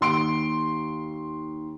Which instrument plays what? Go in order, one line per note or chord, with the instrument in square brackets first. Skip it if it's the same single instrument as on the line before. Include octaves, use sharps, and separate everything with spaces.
[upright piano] D#2 C6 D7